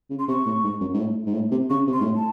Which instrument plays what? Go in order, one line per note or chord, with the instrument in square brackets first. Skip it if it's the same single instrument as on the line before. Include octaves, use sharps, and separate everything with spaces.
[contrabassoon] C#3
[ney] C6
[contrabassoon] C3 [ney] C#6
[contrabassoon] A2
G#2
F#2
G#2
A2
G#2
A2
C3
[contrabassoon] C#3 [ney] C#6
[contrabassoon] C3
[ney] C6
[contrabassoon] G#2
A2
[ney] A5